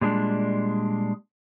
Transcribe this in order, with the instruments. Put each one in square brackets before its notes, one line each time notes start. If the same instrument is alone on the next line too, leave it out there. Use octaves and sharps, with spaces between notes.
[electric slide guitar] A#2 G3 G#3 D4